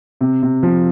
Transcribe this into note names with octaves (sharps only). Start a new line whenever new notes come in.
C3
C3
F3